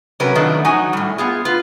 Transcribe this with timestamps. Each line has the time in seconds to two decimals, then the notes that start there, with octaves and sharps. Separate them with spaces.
0.20 C3 F#3 C#4 A#4 B4
0.35 D#3 F3 F#3 A3 D4 B4
0.65 F#3 D#4 F#4 G#5
0.93 A2 G3
1.18 B3 F4 G#4
1.45 F4 B4